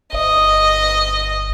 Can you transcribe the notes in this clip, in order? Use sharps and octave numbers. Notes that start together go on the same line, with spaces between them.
G1 D#5